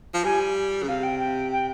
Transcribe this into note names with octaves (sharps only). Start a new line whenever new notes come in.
F3
G3 G#5
C#3
C3 F5
G5
G5
G5